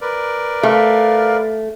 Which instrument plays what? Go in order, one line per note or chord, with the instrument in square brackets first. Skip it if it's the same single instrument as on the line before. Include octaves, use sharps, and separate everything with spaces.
[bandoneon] A#4 B4 D5
[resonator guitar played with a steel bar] A3 [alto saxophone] F5